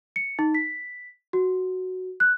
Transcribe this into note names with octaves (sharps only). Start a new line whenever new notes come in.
C#7
D#4
B6
F#4
F#6